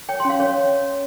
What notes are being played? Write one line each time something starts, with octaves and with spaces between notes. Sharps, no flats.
C#5 G5
C6
C#4 F5
C#4 C#5